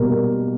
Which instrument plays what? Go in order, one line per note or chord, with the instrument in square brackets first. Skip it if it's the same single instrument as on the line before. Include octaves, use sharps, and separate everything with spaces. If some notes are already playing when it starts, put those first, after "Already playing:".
Already playing: [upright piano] B2 G3 A#3 A#4